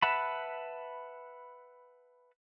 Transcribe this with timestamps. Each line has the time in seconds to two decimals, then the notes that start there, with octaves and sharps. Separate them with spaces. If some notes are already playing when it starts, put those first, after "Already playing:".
0.02 B4 E5 F#5 A5 B5